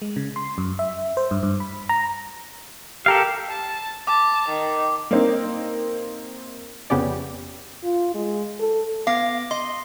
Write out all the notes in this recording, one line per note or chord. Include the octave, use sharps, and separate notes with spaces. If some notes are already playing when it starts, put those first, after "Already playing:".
G#3
C#3
C6
F#2
E5
C5
G2
G2
B5
A#5
G4 A4 A#4 F5
A5
A5 D6
D#3
A#3 C4 D#4
F2 C#3 B3 C#4 G4 D5
F4
G#3
A4
B3 F5 D6 A#6
D#5 C6